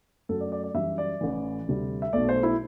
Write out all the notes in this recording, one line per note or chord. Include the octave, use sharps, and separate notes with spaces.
F#2 F#3 A3 A4
D5
D5
D5
F#2 E3 G3 E5
D5
A1 A2 E3
D2 C3 G3
E5
B1 B2 A3 D5
C5
E4